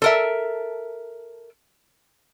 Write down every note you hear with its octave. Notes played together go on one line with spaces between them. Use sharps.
A4 A#4 E5